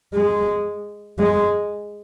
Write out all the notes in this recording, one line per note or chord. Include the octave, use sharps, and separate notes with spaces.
G#3
G#3